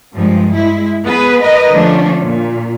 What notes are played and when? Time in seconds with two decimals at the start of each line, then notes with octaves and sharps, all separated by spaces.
0.15 G2 F3 G#3
0.55 G#3 E4
1.03 B3 G#4 B4
1.42 A#4 B4 D#5
1.72 D3 F3 A3 C#4 D4
2.23 A#2